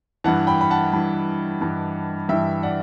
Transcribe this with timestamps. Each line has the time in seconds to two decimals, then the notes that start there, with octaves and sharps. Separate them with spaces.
0.24 G2 E3 F#5 A5
0.47 G5 B5
0.61 B5
0.70 F#5 A5
0.93 G2 E3
1.61 G2 E3
2.29 G2 E3 E5 G5
2.63 D5 F#5